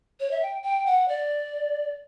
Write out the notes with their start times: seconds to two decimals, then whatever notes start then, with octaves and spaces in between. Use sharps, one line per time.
0.20 C#5
0.31 E5
0.42 G5
0.64 G5
0.86 F#5
1.09 D5